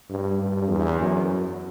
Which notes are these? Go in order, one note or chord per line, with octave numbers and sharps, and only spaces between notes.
G2
G2
E2
F#2